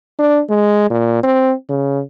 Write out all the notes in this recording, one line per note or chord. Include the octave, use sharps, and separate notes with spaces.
D4
G#3
A#2
C4
C#3